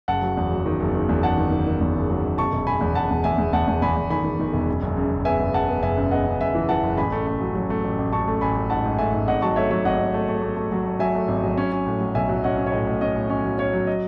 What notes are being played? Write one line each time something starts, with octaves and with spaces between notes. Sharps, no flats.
F#1 F#5 A5
F#3
E2
F#3
D#3
F#1
D#3
E2
F#1 F#5 A5
D#3
D#3
D#3
E2
F#1
F#3
F#1
E1 A5 C#6
E1
E1 G#5 B5
E2
E1 F#5 A5
E2
E2 E5 G#5
E2
E2 F#5 A5
E2
E2 G#5 B5
E2
D#3 G#5 B5
D#3
D#3
E1
F#2
F#1
F#2
F#1
B3 E5 G#5
F#1
F#1 F#5 A5
B3
F#1 E5 G#5
F#2
B3 D#5 F#5
F#2
F#1 E5 G#5
E3
E3 F#5 A5
F#1
A1 G#5 B5
A3
A3
F#3
F#3
A3
A1
A1
A1 A5 C#6
A3
A1 G#5 B5
A3
G#2 F#5 A5
G#2
A3 E5 G#5
G#2
G#1 D#5 F#5
F#3 A5 C#6
A3 C#5 E5
F#3 C#5 E5
G#1 D#5 F#5
G#1
A3
A3
A3
A3
F#3
A3
F#3 E5 G#5
A3
G#1
F#3
C#4
C#4
A2
F#3
B1 E5 G#5
F#3
C#4 D#5 F#5
C#4
C#5
A2 D#5
A2
C#4 D#5
A2
C#4 D#5
F#3
C#4 C#5
F#3
D#5